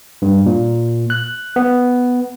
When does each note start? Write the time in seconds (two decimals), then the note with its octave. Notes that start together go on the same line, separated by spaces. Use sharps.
0.22 G2
0.46 A#2
1.10 F#6
1.56 B3